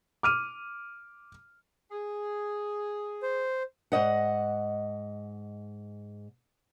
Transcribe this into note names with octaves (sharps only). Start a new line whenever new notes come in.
D6 F6 D#7
G#4
C5
G#2 D#3 D#5 F#5